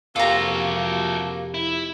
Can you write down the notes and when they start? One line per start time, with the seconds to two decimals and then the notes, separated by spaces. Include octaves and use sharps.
0.16 F2 C3 A#3 F4 F#4 A4 A#5
1.54 E4